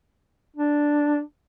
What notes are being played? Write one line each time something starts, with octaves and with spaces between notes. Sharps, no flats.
D4